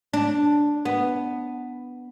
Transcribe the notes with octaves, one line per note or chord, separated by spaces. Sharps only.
D4
B3